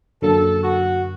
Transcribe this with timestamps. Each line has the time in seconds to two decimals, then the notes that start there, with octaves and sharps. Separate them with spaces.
0.22 F#2 D3 F#3 A#3 A4
0.63 F#4